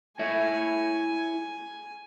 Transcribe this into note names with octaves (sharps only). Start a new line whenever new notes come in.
E4 C#5 E5 G#5